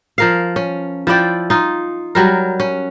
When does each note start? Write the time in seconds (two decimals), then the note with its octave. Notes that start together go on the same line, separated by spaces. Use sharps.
0.18 F3 A#4 F5
0.56 C#4
1.07 F3 E4 D5 G5
1.50 D#4 F4
2.15 F#3 G3 A#4
2.60 C#4